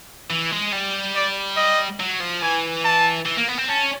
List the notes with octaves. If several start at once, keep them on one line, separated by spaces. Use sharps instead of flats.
E3
G#3
G3
D5
D#5
F#3
F3
E3 G#5
A5
E3
A#3
B3
C4
C#4 A5